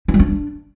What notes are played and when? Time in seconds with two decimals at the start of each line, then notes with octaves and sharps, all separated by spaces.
0.08 D#4
0.14 G3
0.19 D4